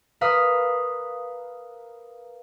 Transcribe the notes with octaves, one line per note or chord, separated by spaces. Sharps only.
A#4 B4 F5 D#6 E6